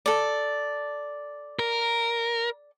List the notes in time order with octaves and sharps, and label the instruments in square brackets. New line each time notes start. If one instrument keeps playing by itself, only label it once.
[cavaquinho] A4 D5
[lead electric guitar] A#4